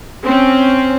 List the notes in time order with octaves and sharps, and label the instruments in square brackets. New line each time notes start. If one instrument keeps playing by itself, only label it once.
[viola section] C4 C#4